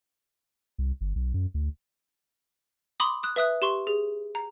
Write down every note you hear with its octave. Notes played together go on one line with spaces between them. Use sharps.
C2
G1
B1
F#2
D2
B5 C6 D6 D#6
D#6 F#6
B4 E5 D#6 F#6
G4 C6 C#6
G#4
A#5